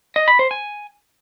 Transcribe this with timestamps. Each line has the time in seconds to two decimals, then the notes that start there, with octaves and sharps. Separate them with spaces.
0.16 D#5
0.28 B5
0.39 C5
0.51 G#5